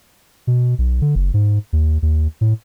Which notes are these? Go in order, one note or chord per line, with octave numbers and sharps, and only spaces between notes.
B2
B1
D3
F#1
G#2
D#2
D#2
A2